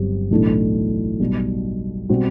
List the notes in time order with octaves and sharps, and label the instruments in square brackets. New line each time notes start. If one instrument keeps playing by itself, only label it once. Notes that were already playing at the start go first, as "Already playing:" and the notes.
Already playing: [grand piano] G1 G2 F#3 C4 G4
B1 A2 E3 A3 D4
B1 B2 G3
B2 G3 C4 F#4